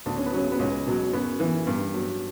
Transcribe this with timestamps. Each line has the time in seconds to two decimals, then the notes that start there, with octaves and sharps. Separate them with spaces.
0.06 D2 D4
0.16 C#4
0.25 B3
0.33 C#3 F#3 C#4
0.51 B3
0.59 C#2 C#4
0.87 B2 F#3
1.13 F#2 B3
1.40 E3
1.67 G2
1.94 F#3